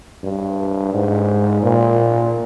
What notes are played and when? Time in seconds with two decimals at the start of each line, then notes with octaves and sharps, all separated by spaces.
0.24 G2
0.93 G#2
1.63 A#2